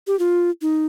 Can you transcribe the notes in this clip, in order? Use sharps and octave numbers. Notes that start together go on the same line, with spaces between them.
G4
F4
D#4